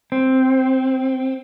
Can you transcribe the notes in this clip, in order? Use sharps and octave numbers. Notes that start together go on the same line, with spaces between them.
C4